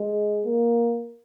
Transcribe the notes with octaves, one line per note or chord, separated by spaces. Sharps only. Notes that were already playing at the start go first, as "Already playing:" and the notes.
Already playing: G#3
A#3